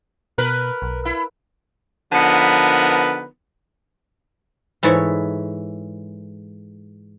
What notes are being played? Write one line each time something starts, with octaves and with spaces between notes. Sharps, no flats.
B2 A#4 B4
B1
E4
D3 F3 B3 D#4 A#4 B4
G#2 E3 E4 A4 C#5